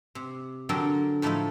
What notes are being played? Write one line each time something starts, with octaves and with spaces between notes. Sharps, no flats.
C3
D3 F#3 A4 A#4 G5
A2 F3 A3 D#4 F4 A4